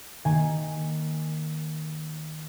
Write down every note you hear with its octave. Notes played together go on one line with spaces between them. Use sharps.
D#3 A#3 G#5